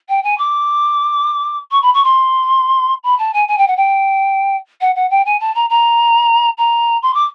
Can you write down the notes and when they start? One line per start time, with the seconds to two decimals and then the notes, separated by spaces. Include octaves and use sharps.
0.08 G5
0.23 G#5
0.37 D6
1.71 C#6
1.82 B5
1.93 C#6
2.04 C6
3.03 B5
3.18 A5
3.33 G#5
3.48 G#5
3.57 G5
3.67 F#5
3.76 G5
4.80 F#5
4.95 F#5
5.10 G5
5.25 G#5
5.39 A5
5.54 A#5
5.69 A#5
6.57 A#5
7.02 C6
7.13 D6